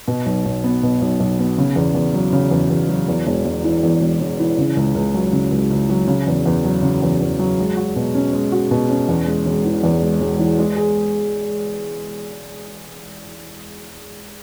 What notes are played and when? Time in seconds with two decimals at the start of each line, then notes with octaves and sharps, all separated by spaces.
0.08 B2
0.26 B1
0.45 B1
0.64 B3
0.83 B2
1.02 B1
1.20 B1
1.39 B3
1.58 C#3
1.76 E2
1.95 E2
2.14 F#3
2.32 C#3
2.51 E2
2.70 E2
2.89 F#3
3.08 E2
3.27 E1
3.45 E1
3.64 E3
3.83 E2
4.01 E1
4.21 E1
4.39 E3
4.58 C#3
4.77 C#2
4.95 C#2
5.14 F#3
5.33 C#3
5.52 C#2
5.71 C#2
5.89 F#3
6.07 C#3
6.27 E2
6.46 E2
6.64 F#3
6.82 C#3
7.02 E2
7.20 E2
7.39 F#3
7.58 G#3
7.77 F#4
7.96 B2
8.15 C#4
8.33 G#3
8.52 F#4
8.71 B2
8.89 C#4
9.08 E2
9.26 G#3
9.46 E1
9.65 E3
9.83 E2
10.02 G#3
10.20 E1
10.39 E3
10.59 G#3
10.76 G#4